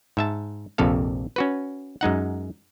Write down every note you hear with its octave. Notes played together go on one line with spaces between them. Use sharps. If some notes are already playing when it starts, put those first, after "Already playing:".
G#2 E5 A5
A#1 F2 C3 A4 F5
C#4 F#4 B4
F#2 G#3 D#4 F#5